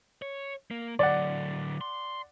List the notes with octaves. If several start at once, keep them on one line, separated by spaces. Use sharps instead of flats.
C#5
A#3
D3 F#3 D5 F#5
C6